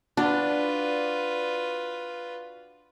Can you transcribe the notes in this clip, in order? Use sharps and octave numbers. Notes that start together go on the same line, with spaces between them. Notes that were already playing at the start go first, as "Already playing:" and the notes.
D4 F4 F#4 B4 D5